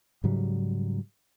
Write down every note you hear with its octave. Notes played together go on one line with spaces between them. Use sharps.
G#2 C#3 F#3 G3